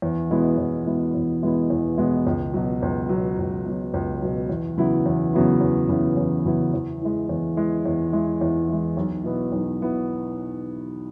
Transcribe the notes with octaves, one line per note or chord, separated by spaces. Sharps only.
E2
B2 G#3 B3 E4
E2
B2 G#3 B3 E4
E2
B2 G#3 B3 E4
E2
B2 G#3 B3 E4
C#2
B2 F#3
C#2
B2 F#3
C#2
B2 F#3
C#2
B2 F#3
E2
C#3 F#3 B3 E4
E2
C#3 F#3 B3 E4
E2
C#3 F#3 B3 E4
E2
C#3 F#3 B3 E4
E2
E3 G#3
E2
E3 G#3
E2
E3 G#3
E2
E3 G#3
B1
B2 B3 E4
B1
B2 B3 E4